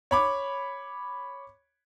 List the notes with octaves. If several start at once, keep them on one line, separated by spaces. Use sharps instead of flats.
C#5 B5 D6